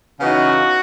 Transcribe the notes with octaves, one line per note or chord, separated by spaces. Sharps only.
C#3 E3 B3 D#4 F#4